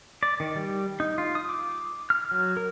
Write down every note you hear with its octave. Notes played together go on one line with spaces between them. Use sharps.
D5
D#3
G3
D#4
F4
D#6
D6
F6
F#3
A#4